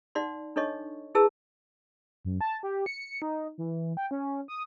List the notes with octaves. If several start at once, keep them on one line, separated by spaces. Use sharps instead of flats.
D#4 D5 F#5 C6
D4 D#4 A4 C#5 D#5 C#6
E4 G#4 B4 A5 E6
F#2
A5
G4
C#7
D#4
E3
G5
C#4
D#6